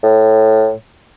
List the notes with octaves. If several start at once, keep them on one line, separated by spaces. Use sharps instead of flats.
A2